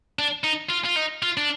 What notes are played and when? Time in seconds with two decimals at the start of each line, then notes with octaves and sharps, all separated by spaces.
0.19 D4
0.44 D#4
0.70 F4
0.85 F4
0.97 D#4
1.23 F4
1.37 D4